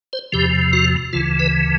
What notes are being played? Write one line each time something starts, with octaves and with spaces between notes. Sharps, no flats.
C5
E2 C3 F3 G4
F#4
D2 C#3 E3 F4
B4